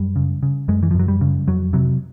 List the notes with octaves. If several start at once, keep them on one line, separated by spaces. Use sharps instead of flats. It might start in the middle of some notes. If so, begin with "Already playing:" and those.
Already playing: F#2 G3
C#3
C#3
F#2 G#3
E3
F3
F#2
F#3
G3
C#3
F2 F#3
C3 F#3